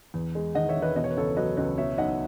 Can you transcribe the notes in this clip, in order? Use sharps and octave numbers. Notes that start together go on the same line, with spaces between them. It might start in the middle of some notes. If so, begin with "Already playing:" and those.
E2
G#3
D#3 D#5 F#5
C#5 E5
E1
B4 D#5
B2 D#5
C#5
B4
C#2 A4 C#5
F#3 B4 D#5
C#2 B4 D#5
B2 C#5 E5
B1 D#5 F#5